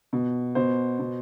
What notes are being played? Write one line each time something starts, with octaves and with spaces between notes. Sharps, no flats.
B2
B2 C5
B2